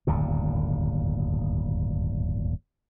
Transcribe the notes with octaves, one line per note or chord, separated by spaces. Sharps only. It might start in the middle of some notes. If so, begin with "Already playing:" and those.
D1 G1 D#2 A#2